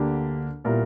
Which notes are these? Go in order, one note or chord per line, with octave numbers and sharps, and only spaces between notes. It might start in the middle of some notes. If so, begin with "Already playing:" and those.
Already playing: D2 D3 A#3 D4 G4
A#2 G3 B3 E4 A#4